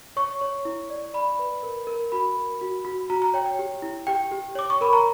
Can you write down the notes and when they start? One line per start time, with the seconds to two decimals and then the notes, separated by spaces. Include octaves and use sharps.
0.16 C#5 C#6
0.41 C#5
0.65 E4
0.90 D5
1.14 D5 B5
1.39 B4
1.63 A#4
1.87 A#4
2.12 F#4 B5
2.37 A#4
2.61 F#4
2.85 F#4
3.10 F#4 A#5
3.22 A#5
3.34 C#5 G5
3.46 G5
3.59 G4
3.82 E4
4.07 G4 G5
4.32 G4
4.55 C#5 D6
4.70 C#6
4.81 A#4 B5
4.93 A#5